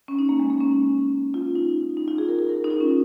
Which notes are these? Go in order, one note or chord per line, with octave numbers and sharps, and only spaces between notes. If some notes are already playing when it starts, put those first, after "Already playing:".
C#4
D#4
A#3
G#3
A#3
C#4
F4
D#4
D#4
F4
G#4
A#4
G#4
A#4
D#4
F4
C#4